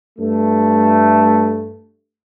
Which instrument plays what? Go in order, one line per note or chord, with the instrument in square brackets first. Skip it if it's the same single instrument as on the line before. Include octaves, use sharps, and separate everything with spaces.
[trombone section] G2 A3